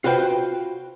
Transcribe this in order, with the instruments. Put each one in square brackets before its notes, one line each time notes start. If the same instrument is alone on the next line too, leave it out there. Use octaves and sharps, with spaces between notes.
[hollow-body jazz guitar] F4 F#4 B4 C5 G5